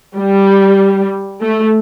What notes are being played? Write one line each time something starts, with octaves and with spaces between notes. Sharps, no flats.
G3
A3